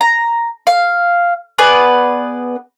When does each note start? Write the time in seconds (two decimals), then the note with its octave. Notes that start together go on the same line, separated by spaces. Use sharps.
0.01 A#5
0.67 F5
1.58 B3 G#4 B4 D5